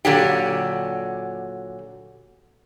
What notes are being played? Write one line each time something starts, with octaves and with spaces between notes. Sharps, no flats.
A#2 D3 F#3 G4